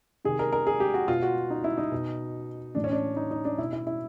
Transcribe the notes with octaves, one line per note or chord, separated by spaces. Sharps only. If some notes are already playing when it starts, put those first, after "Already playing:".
C3 D#3 G#4
A#4
A#4
G#4
G4
F#4
B2 F4
F#4
D#4
E4
D#4
B2
A2 E3 D4
C#4
D4
D#4
D#4
D4
B2 E4
E4
E4